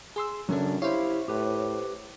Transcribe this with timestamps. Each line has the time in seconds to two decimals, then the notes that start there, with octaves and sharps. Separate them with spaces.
0.16 G#4 C6 E6
0.49 F#2 C#3 F#3 C#4 D4 A4
0.82 E4 G4 C5 C#5 F5
1.28 A2 G4 B4